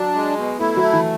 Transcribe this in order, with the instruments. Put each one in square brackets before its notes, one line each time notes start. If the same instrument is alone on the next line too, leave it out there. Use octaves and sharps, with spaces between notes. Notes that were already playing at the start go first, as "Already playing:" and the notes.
Already playing: [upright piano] F#3 [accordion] D4
[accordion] G#3
B2
[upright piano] A3 [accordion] E4
[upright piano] F#3
[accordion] A3
[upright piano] E3